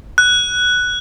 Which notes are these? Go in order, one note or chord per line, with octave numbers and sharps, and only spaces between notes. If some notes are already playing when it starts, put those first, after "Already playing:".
F#6